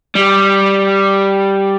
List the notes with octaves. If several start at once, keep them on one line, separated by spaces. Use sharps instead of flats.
G3